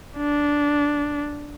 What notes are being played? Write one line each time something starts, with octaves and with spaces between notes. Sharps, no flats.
D4